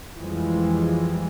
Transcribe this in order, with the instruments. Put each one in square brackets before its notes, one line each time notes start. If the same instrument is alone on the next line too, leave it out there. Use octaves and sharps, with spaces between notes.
[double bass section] F2 E3 F3 G3 G#3